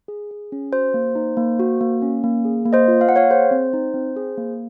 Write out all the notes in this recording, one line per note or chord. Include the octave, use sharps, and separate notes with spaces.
G#4
G#4
C#4
F#4 C5
A#3
D#4
A#3
F#4
A#3
C#4
A#3
G#4
A#3
C5 D#5
F4
F5
A#3 F#5
C#5 F5
G#4 C5
C4
D#4
C4
G#4
A#3